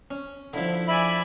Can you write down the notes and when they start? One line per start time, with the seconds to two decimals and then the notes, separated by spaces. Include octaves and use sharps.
0.11 C#4
0.54 D3 F3 E4
0.88 D5 E5 G#5 B5